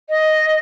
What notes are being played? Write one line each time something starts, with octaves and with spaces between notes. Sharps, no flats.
D#5